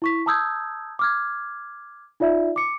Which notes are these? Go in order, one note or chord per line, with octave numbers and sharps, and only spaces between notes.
E4 C#6 B6
A5 A#5 D#6 E6 G6 G#6
D6 F6 G#6
D#4 F4 D5 E5
D6 C#7